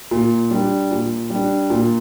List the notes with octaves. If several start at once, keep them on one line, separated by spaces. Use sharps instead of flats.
A#2
G3 D4
A#2
G3 D4
A#2